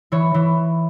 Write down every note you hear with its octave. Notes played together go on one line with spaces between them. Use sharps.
E3 C#5
E3